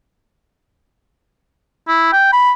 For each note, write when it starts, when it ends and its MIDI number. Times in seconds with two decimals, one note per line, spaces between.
1.88 2.12 64
2.13 2.31 79
2.33 2.52 83